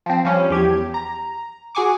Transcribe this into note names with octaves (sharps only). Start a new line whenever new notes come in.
F3 C4
F3 G3 C#4
E2 G4 G#6
A#5
F#4 G#4 G#5 C#6 D6